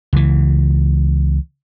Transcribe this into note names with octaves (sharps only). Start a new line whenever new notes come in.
C#2 E3